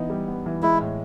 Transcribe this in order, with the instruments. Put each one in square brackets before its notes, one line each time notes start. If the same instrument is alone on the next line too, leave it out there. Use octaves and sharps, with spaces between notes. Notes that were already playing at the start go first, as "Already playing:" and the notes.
Already playing: [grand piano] E3 B3 D#4
G3
B3
E3
[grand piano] G#3 [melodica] E4
[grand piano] A2